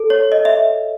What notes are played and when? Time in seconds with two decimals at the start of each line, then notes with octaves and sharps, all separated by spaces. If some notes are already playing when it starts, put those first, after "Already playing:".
Already playing: A4
0.10 C#5
0.32 D#5
0.45 E5